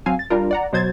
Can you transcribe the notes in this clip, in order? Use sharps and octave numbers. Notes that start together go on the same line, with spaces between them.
F#3 C4 F5 G#5
A6
G3 D4 F4 A#4
D5 F#5 A#5
B2 F#3 C5 G#6 A6